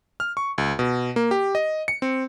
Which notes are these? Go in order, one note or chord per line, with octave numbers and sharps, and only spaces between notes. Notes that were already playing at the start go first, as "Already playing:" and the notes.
F6
C#6
C#2
B2
A#3
G4
D#5
C#7
C4